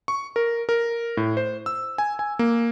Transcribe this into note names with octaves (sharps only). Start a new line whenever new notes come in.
C#6
A#4
A#4
A2
C5
E6
G#5
G#5
A#3